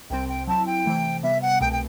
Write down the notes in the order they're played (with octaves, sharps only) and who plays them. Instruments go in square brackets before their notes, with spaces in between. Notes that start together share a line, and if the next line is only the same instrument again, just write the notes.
[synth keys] C2 C3 G3 C4 [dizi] G5
[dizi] G5
[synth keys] F#3 C4 E4 [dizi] A5
[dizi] G5
[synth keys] C3 E3 A3
[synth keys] C3 G3 B3 [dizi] E5
[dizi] F#5
[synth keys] C2 B2 A3 [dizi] G5
[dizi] G5